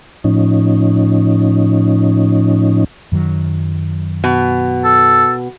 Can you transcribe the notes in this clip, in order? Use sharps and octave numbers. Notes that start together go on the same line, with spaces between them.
A2 F3 C#4 D#4
F#2 D#3 F#3
B2
A4